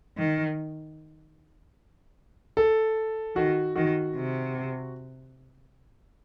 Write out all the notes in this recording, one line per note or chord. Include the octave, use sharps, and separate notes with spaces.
D#3
A4
D#3 F#4
D#3 F#4
C3